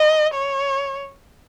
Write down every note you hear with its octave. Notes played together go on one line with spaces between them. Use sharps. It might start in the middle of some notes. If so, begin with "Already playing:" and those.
Already playing: D#5
C#5